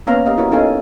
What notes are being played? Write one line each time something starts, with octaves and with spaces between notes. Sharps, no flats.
A#3 B3 C#4 F5 A#5
G4 A#4 D#5 F5
E4 F#4 A#4 C#5
B3 C#4 D#4 A4 F5 G#5